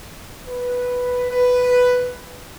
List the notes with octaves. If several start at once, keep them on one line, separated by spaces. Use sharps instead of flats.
B4
B4